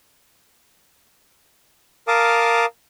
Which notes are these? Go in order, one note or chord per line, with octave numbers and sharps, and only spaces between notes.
A#4 F5 A5 D6 D#6